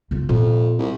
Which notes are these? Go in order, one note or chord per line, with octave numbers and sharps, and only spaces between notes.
C#3 F4
F2 A#2
C2